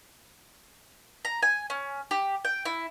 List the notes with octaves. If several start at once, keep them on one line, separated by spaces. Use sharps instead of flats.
A#5
G#5
C#4
G4
G5
E4